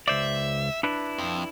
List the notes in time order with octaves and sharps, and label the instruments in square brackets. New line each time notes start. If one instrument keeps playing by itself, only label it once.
[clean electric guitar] C#2 C5 D5 [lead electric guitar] E5
[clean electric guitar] D4 E4 B4
[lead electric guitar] F2